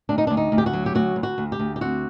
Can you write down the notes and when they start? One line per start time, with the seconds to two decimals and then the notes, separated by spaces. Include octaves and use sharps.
0.09 D2 D4
0.18 D#4
0.27 D4
0.30 D2
0.37 D#4
0.52 D2
0.58 G4
0.66 F#4
0.73 F#3
0.86 G4
0.95 D2 F#4
1.16 D2
1.23 F#4
1.38 D2
1.52 G4
1.59 D2
1.76 G4
1.81 C4 F#4